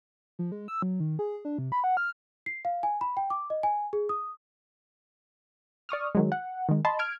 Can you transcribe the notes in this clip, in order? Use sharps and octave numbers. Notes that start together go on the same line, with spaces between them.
F3
G#3
E6
F#3
D#3
G#4
D4
C3
B5
F#5
F6
C7
F5
G#5
B5
G5
D6
D#5
G#5
G#4
D#6
D5 C#6 D#6 F6
D#3 F#3 G#3
F#5
D#3 G#3
D#5 A5 B5 C6
F6 G#6 D7